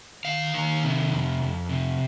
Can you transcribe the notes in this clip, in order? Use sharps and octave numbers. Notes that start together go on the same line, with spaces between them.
D#3 F5
D#3
C3
F2
F2
C3